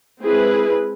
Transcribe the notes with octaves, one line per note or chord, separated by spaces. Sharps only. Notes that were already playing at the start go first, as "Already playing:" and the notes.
G#3 C4 E4 G#4 B4